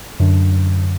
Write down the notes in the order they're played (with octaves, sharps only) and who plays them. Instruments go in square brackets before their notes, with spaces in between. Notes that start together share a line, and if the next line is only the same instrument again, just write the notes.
[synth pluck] F#2 D3